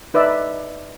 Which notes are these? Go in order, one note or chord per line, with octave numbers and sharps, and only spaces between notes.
D#4 B4 D5 E5